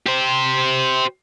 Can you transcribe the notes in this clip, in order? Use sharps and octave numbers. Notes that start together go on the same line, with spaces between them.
G4 C5